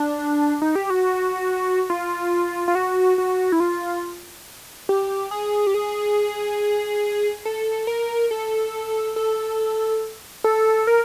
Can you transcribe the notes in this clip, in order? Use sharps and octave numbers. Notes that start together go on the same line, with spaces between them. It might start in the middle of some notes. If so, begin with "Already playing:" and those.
Already playing: D4
D#4
G4
F#4
F4
F4
F#4
F#4
E4
F4
G4
G#4
G4
G#4
A4
A#4
A4
A4
A4
A#4